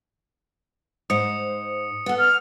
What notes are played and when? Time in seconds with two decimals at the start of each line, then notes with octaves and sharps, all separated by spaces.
1.10 G#2 C5 D#6 C#7
2.06 B3 A4 F#5
2.18 F6